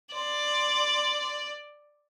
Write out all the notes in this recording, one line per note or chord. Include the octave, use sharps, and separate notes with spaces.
D5 C6